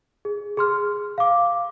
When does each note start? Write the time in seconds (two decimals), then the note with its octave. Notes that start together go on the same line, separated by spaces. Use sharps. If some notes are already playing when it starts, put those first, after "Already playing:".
0.25 G#4
0.57 G#4 C6 F6
1.18 F5 D6